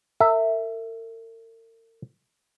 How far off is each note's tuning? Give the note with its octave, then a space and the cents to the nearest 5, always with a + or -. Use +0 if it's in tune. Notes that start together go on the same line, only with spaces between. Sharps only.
A#4 -45 E5 +0